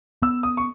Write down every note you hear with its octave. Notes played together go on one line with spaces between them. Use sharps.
B3 E6
D#6
C#6